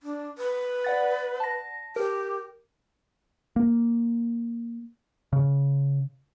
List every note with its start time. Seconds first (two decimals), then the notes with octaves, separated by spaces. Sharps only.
0.03 D4
0.38 B4
0.84 D5 F#5 A6
1.40 A5 A#6
1.96 G4 A#4
3.56 A#3
5.33 C#3